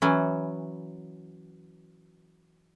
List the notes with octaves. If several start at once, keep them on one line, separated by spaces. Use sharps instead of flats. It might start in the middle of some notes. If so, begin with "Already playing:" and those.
E3 F#3 C#4